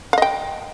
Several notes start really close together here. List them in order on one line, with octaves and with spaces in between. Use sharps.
F5 D#5 G5